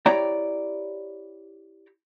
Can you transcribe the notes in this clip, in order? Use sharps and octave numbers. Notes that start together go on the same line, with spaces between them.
E4 G4 C#5 D5 G5 A#5